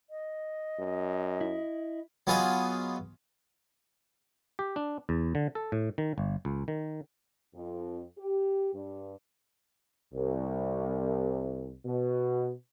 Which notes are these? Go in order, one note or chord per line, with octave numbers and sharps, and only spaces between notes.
D#5
F#2
E4
F#3 B3 F4 G#4 D#5
G4
D4
E2
D3
A4
A2
D#3
G1
C#2
D#3
F2
G4
G2
C2
B2